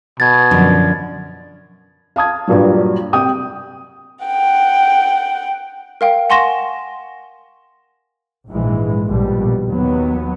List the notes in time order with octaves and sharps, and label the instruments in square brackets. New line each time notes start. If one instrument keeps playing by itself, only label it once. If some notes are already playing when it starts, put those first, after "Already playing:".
[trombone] B2 [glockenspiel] G#6 A6
[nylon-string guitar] F#2 D3 F3
[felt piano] F5 A5 D#6 G#6
G2 A#2 F#3
C2 G5 D#6
[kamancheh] F#5 G5
[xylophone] A#4 F5 G5
F#5 G#5 C6 C#6 A#6 E7
[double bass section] A#1 G#2 E3 G#3
A#1 B2 G3
D#2 F#3 B3